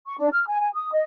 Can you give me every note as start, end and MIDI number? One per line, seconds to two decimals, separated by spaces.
0.07 0.14 85
0.18 0.28 62
0.32 0.45 89
0.47 0.60 80
0.60 0.68 80
0.74 0.89 87
0.92 1.03 75